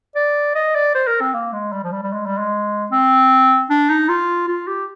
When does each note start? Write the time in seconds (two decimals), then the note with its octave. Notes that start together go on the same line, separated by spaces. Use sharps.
0.16 D5
0.55 D#5
0.75 D5
0.95 C5
1.07 A#4
1.21 C4
1.34 A#3
1.53 G#3
1.73 G3
1.83 F3
1.92 G3
2.03 G3
2.13 G#3
2.26 G3
2.38 G#3
2.91 C4
3.70 D4
3.90 D#4
4.09 F4
4.48 F4
4.67 G4